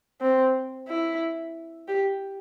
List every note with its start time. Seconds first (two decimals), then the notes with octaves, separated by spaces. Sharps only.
0.21 C4
0.88 E4
1.88 G4